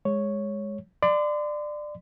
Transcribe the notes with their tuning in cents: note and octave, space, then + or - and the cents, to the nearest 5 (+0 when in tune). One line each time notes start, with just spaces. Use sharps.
G#3 -5 C#5 +0
D5 +20 C6 -35